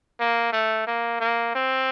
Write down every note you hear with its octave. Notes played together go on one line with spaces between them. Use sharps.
A#3
A3
A#3
A#3
C4